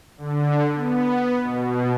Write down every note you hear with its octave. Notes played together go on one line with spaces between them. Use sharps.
D3
B3
B2